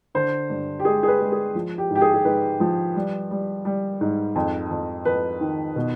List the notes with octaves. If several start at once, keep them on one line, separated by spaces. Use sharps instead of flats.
D3 C5
G2
G4
G#3 G#4
G#4
B4
G#3
G#4
F3
G4
G#2 G4
G#4
G#4
G#2 B4
F3
G3
G3
G3
G#2
F2
F2
F2 B4
D#3
B2